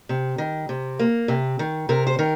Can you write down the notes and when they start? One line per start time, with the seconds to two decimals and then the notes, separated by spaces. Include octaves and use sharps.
0.09 C3
0.38 D#3
0.69 C3
0.99 A#3
1.28 C3
1.59 D#3
1.89 C3 A#4
2.07 C5
2.19 D#3 A#4